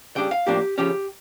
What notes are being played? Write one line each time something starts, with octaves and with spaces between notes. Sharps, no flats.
C#3 G3 D4 G5
F5
A2 F3 A#3 D4 G4
C#3 F3 C#4 G4